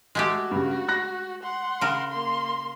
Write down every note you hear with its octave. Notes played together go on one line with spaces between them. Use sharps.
G#3 A3 F#4 G4
G2 C#3
F#6 A#6
F#5 C6
C#3 A#4
A#3 C6